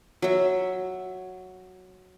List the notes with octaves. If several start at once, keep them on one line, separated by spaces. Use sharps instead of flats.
F#3 E5